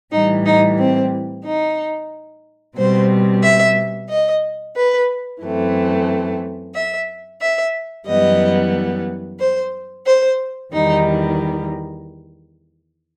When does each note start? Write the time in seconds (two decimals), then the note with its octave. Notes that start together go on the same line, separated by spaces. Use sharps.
0.12 A2 E3 G3 D#4
0.45 D#4
0.78 C4
1.45 D#4
2.77 B2 G3 C4 C5
3.43 E5
4.10 D#5
4.76 B4
5.43 F#2 E3 A3 C4
6.75 E5
7.41 E5
8.07 F#2 E3 G3 B3 D#5
9.39 C5
10.06 C5
10.72 E2 D#3 G3 D#4